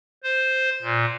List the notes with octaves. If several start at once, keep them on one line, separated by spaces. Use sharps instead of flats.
C5
A#2